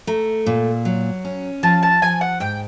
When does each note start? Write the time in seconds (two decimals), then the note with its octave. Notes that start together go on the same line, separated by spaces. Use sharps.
0.07 A3 A#5
0.46 A#2
0.85 F#3
1.25 C#4
1.63 F3 A5
1.83 A5
2.02 F3 G#5
2.21 F#5
2.40 G#2 G5